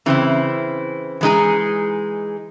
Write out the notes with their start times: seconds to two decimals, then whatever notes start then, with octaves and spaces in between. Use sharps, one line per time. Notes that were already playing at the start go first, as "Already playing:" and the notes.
0.06 C#3 E3 C4 E4
1.21 E3 G#3 D#4 G#4